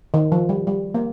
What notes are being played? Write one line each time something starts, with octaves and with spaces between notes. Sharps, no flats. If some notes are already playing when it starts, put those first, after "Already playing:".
D#3
F3
G3
G3
A#3